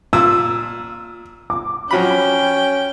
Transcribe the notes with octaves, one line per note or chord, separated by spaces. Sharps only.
A#2 E6
D6
F3 F#3 C#4 G5 B5